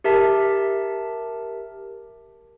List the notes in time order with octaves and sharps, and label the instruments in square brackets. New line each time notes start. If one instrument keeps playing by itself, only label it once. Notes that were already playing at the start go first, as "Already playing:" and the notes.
[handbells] G4 A#4 E5 A5 B6